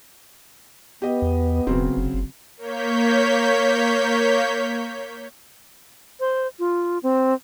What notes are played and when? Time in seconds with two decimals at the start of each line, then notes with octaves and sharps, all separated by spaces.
1.02 B3 G4 D#5
1.22 E2
1.67 E1 C#3 F#3 C4
1.97 F1
2.14 F#1
2.57 A#3 C#5 G6 B6
6.20 C5
6.59 F4
7.03 C4